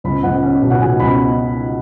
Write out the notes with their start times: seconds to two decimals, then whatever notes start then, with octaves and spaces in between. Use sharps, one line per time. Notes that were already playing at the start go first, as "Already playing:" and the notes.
0.04 C#2 B5
0.23 C#2 F#5
0.43 C#4
0.62 B2
0.70 F#5
0.80 B2 G#5
0.99 C#2 B5